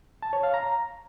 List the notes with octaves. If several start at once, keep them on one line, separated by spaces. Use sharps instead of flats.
A5
C#5
F5
A#5